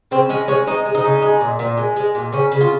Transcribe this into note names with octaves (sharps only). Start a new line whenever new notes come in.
C#3 C4
G#3 C#4
G#3 C#4
G#3 D#4
G#3
D#4
C#3
G#3
A#2
A#2
G#3
G#3
A#2
C#3 C#4
C#3
F4